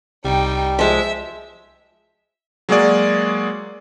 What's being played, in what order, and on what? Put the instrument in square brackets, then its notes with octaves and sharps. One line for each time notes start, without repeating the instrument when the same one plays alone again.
[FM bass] C2 [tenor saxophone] G3 [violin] D#4 G5
[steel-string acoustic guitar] F3 G#3 [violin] E5
[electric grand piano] F#3 G#3 A#3 F#4 G#4 D5